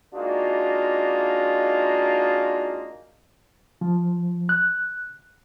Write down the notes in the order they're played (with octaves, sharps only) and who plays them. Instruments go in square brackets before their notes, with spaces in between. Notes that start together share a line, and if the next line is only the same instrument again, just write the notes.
[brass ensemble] G#3 A#3 D4 D#4 F4 F#4
[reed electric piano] F3
F#6